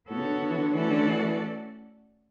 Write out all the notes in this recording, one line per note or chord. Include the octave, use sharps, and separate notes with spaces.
A2 B3 F#4 A4 C#5
C#3
D3
D3
E3
D3
E3 A3 C#4 F#4 A4 D5
D3
E3
E3